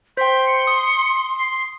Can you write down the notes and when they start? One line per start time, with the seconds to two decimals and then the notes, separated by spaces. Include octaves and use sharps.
0.17 C5 G5 C6 B6
0.47 C#7
0.67 D#6
1.39 C7